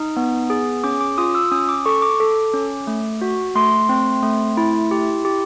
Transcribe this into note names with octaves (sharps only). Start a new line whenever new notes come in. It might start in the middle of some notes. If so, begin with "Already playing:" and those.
Already playing: D#4 D#6
B3
G#4
C#4 D6
D6
F4 D#6
E6
C#4 D#6
D6
A4 C#6
D6
A4
C#4
A3
F#4
A3 C6
C4
A3
E4
G4
G4